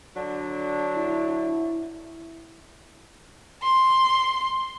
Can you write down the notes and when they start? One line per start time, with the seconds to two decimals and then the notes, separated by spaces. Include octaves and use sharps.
0.16 D3 F#3 D4
0.97 E4
3.63 C6